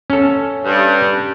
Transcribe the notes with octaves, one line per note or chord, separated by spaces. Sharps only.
C#4 A4
G2